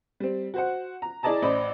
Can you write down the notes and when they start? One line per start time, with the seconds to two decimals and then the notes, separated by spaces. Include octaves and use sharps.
0.20 G3 C4
0.54 F#4 C5 F#5
1.02 A#5
1.23 E4 G#4 D5 D#5 A5 A#5
1.42 A1 C5 D5 D#5 B5